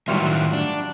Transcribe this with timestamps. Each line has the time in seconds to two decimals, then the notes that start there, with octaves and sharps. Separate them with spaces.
0.08 A2 D#3 F#3 G3 F4 E5
0.53 D4